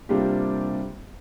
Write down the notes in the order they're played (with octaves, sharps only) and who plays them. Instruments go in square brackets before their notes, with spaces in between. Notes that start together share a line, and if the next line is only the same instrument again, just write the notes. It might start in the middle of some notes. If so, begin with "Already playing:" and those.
[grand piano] C3 G3 A#3 D4 F4 G4